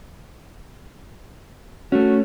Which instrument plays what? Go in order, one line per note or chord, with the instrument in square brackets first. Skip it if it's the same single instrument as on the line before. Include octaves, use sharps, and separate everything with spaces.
[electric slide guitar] A3 C#4 [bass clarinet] F#4